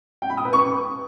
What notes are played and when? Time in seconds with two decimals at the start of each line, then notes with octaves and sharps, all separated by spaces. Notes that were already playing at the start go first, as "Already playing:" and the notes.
0.22 G5
0.30 B5
0.37 D#6
0.45 B4
0.53 C#6